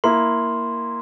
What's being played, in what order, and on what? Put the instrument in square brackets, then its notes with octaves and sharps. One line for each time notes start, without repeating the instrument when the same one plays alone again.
[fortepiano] A#3 E4 [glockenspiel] C6